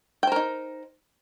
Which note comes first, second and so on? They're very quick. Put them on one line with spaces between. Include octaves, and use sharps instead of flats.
G5 C5 A#4 D#4